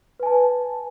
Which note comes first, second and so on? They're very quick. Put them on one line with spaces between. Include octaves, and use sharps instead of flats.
B4 G#5 A5